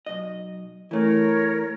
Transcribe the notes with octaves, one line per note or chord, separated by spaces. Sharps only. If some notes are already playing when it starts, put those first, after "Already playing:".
B1 D#5
E3 A3 A#4 C#5